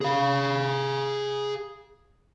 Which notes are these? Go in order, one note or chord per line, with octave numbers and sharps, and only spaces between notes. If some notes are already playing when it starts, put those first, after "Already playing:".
G#4 F5